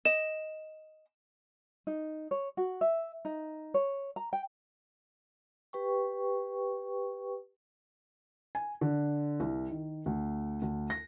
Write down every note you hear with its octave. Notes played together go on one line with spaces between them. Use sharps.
D#5 E7
D#4
C#5
F#4
E5
D#4
C#5
A#5
G5
G4 B4 G5 C#6
G#5
D3
C2
D#3
D2
D2
A#6